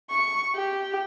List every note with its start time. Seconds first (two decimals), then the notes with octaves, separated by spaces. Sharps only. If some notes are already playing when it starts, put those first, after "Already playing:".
0.10 C#6
0.55 G4